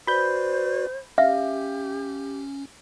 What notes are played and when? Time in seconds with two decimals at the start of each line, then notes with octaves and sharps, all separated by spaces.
0.07 F#4 B4 C5 D5 B5 G6
1.18 C#4 G4 E5 F5